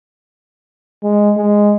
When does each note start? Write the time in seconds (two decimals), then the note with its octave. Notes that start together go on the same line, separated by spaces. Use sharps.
1.03 G#3
1.37 G#3